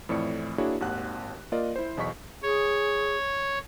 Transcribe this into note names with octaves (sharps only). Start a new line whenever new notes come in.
F2 A2 E3 D5 C#7
A#3 D4 E4 F#4 G#4 C#5
G#1 D#2 F#5 F#6
A#3 F4 A#4 D5 D#5
E4 C5
B1 E2 D#5 C#6 B6
G#4 C#5